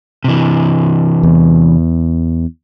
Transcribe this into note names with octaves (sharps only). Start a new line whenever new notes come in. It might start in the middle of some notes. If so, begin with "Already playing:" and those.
C3 E3
E2